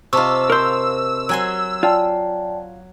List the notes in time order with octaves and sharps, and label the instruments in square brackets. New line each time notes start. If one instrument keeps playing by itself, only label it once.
[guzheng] C3 F4 [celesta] D#5 A5 C#6 [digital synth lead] E6
[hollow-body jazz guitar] A#4 C5
[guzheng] F#3 G#5 C6
[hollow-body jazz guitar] F4 [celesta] D5 G5 A5